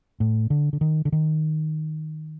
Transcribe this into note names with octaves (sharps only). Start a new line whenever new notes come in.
A2
D3
D3
D#3
D3
D#3